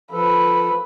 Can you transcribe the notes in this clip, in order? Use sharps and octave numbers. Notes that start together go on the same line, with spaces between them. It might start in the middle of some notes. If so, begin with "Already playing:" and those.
F3 A4 B4